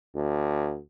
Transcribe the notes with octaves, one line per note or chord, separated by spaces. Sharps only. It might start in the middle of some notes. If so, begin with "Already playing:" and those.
D2